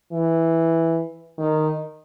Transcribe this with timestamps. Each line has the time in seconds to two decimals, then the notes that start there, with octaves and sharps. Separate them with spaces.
0.13 E3
1.39 D#3